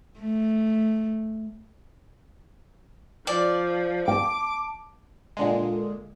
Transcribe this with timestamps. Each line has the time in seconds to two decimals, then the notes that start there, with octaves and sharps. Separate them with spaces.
0.20 A3
3.27 F3 D5
4.08 G5 A5 D6
5.37 A#2 D3 G#3